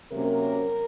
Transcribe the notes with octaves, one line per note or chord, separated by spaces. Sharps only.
C3 F#3 A#3 C#4 A#4